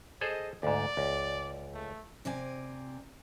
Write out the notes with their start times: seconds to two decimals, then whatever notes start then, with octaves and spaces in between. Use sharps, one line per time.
0.21 G#4 A4 C5 D#5
0.63 D2 G#2 D5
0.97 C#2
1.74 A3
2.25 C3 C4 D5 G#5